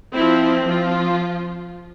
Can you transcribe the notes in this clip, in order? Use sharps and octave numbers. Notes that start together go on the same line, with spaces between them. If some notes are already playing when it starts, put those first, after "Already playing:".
F3 C4 E4
F3 F4